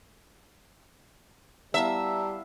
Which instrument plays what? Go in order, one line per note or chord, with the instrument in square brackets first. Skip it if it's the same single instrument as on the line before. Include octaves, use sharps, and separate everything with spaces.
[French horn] G3 [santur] B3 E4 F5 [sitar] E5 [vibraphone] A5 A#5 E6